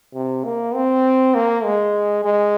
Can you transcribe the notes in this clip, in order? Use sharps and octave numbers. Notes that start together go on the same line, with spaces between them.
C3
A#3
C4
A#3
G#3
G#3